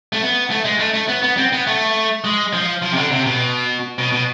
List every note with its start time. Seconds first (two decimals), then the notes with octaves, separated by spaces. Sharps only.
0.12 A3
0.22 B3
0.50 A3
0.65 G#3
0.79 A3
0.94 A3
1.08 B3
1.23 B3
1.37 C4
1.53 B3
1.67 A3
2.24 G#3
2.53 F3
2.82 F3
2.92 C3
2.96 D3
3.12 C3
3.26 B2
3.98 B2
4.12 B2